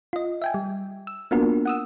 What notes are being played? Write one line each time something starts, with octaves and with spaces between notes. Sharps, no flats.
F4 D#5
E5 G5 G#5
G3
E6
A#3 B3 D4 F4 F#4 A#4
F#5 D#6 E6